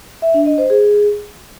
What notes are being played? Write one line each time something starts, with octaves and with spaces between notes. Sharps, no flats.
E5
D4
D#5
C5
G#4